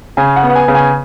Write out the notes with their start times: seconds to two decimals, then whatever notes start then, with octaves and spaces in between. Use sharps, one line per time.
0.17 C#3 G#5
0.36 F#5
0.43 B3
0.50 F#5
0.56 G#5
0.68 C#3
0.75 G#5